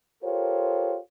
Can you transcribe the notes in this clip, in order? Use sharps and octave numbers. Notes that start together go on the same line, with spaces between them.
F4 G4 A4 A#4 C5 C#5